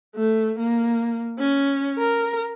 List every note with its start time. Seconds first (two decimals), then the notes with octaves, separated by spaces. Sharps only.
0.15 A3
0.59 A#3
1.39 C#4
1.98 A#4